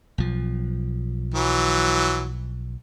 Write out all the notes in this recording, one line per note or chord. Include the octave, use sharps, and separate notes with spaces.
B1 F3
E3 F#3